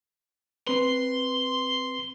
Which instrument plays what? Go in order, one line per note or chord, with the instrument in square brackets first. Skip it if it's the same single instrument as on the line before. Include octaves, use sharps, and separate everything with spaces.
[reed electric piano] C4 B4 [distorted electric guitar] C6